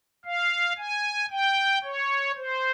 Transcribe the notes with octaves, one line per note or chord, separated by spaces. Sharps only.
F5
G#5
G5
C#5
C5